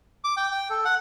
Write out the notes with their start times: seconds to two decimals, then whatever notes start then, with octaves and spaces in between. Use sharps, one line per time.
0.24 D6
0.37 G5
0.52 G5
0.70 A4
0.85 F#5